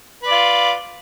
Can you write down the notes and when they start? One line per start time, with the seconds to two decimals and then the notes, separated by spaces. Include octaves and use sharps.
0.23 B4
0.27 D5
0.32 F4